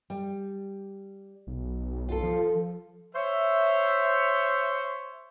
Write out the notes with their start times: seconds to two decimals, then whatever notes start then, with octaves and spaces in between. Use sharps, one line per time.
0.10 G3
1.47 B1
2.09 F4 A4
2.23 F3
3.15 C5 C#5 E5